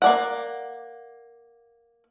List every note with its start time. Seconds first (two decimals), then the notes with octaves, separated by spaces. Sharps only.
0.02 A#3 D5 F#5